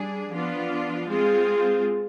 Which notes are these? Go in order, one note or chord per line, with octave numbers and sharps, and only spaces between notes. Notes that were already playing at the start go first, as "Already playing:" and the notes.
Already playing: G3 D4 G#4
F3 B3 D4 F4
G#3 C4 F4 G#4